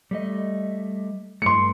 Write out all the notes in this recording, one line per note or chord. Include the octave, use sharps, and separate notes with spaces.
G3 A3 D#5
G2 A3 C6 C#7